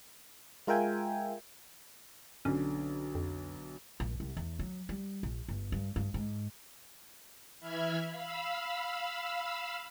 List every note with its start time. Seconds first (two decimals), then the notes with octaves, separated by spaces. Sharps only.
0.67 G#3 F4 A#4 E5 G5 G#5
2.45 B1 D3 C#4
3.15 F2
4.00 A#1
4.20 C2
4.37 E2
4.59 F#3
4.89 G3
5.23 A#1
5.48 G1
5.72 G2
5.96 G2
6.14 G#2
7.59 E3 E5 B5 F6 G#6
8.10 F5 B5 E6